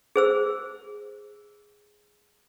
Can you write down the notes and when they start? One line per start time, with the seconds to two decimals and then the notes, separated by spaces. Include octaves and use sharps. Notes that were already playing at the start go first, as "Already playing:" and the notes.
0.16 G#4 C5 E6